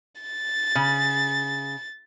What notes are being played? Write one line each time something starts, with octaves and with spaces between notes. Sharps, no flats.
A6
C#3